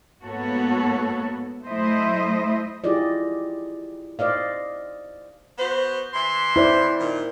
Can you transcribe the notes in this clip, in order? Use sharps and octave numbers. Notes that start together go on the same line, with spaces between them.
G#2 A#3 B3 F#4 A4 C#5
F#3 A3 E4 C5 D#5 E5
E4 F4 G4 G#4 D5 D#5
C5 D5 D#5 F5
B3 F#4 C5
E3 E5 C6
E4 C5 D5
A#2 D#3